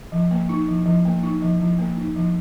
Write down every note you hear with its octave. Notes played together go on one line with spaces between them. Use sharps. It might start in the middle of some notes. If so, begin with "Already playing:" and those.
F3
A#3
D#4
F3
F3
A#3
D#4
F3
F3
A#3
D#4
F3